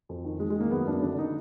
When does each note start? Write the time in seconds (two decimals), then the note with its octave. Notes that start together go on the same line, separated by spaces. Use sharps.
0.09 F2
0.25 D#3
0.40 D#3 G#3
0.50 G#3
0.56 D#3 A#3
0.71 F#2 B3
0.87 F#2 D4
1.02 D3 D4
1.18 D3 D#4